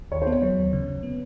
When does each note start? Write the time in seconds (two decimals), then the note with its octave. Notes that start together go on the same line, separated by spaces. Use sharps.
0.11 D#2 C#5
0.22 C5
0.27 B3
0.32 C#5
0.42 F#3
0.57 D#2
0.73 C#3
0.88 C#3
1.03 B3